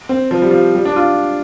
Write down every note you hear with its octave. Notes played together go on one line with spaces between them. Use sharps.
C4
F3
G3
F3
G3
D4
F4